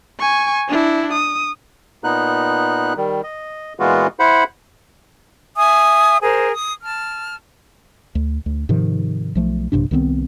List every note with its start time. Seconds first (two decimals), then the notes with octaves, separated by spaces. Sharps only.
0.20 G#5 C#6
0.68 D4 E4
1.13 D#6
2.04 A#2 B3 D#4 F#6
2.97 D#3 G3
3.24 D#5
3.79 A#2 E3 G#3 B3 F4 F#4
4.19 E4 C5 F#5 B5
5.57 E5 G#5 D#6
6.22 G#4 A#4 C5
6.53 D#6
6.84 A5 F6
8.15 D2
8.46 D2
8.69 G#2 C3 D#3 F3
9.35 B1 F3 A3
9.72 A#1 G2 C3 D4
9.91 C2 D#3 B3 C4